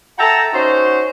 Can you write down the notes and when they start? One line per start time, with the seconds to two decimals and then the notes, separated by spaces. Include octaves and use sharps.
0.19 A4 E5 F#5 G5 A5 A#5
0.53 C#4 D#4 F#4 C5